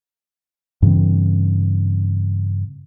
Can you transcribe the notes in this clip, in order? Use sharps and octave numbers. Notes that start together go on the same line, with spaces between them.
G2 C#3 E3 C4